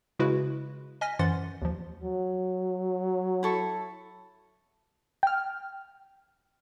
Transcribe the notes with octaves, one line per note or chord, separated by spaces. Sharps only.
C#3 G#3 E4 F#4 B4
D#5 G#5 F6 A#6 B6
F#2 E3 C5 F#5 C6 A6
D#2 F3
F#3
E4 A4 C#6
G5 F6